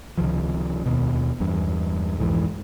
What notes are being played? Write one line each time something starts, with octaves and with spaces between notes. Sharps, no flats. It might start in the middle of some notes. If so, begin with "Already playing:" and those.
C#2 C3 D#3 F3
D#2 B2
E2 G2
C2 F2 G#2 E3